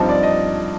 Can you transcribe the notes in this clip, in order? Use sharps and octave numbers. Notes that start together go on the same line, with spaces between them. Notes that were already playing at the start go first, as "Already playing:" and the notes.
Already playing: G2 F3 C4 D#4 A5
D5
D#5